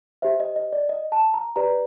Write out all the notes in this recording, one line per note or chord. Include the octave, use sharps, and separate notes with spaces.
G4 C5 E5
D#5
D#5
D5
D#5
A5
A#5
G4 B4 D5 A#5